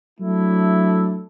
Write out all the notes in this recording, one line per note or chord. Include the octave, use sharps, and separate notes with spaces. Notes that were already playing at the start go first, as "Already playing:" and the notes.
F#3 A3 D4 E4 A4